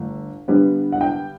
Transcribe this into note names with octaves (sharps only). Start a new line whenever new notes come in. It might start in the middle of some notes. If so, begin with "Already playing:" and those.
Already playing: G1 A3
G2 D3 G3 B3
F#5
G5